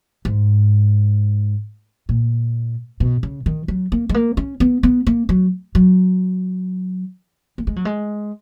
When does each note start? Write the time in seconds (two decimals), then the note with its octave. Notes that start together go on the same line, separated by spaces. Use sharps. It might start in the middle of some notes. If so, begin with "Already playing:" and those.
0.25 G#2
2.09 A#2
3.00 B2
3.23 C#3
3.46 D#3
3.68 F#3
3.92 A#3
4.09 G#3
4.14 A#3
4.37 C#4
4.60 B3
4.83 B3
5.07 A#3
5.29 F#3
5.75 F#3
7.58 A#3
7.67 G#3
7.76 F#3
7.85 G#3